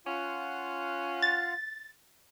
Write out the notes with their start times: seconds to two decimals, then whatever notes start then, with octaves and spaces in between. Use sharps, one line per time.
0.07 C#4 F4 F5 F#5
1.22 A6